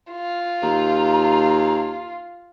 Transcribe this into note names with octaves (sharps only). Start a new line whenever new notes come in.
F4
D#2 A#5